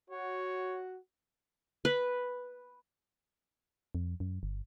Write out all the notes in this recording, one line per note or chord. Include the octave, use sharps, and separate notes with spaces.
F#4 C#5
B4
F2
F#2
G1